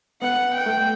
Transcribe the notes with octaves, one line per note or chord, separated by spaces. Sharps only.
B3 F#5
G5
A3